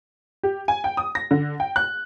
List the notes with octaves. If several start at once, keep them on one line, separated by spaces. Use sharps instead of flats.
G4
G#5
G5
D#6
A#6
D3
G5
F#6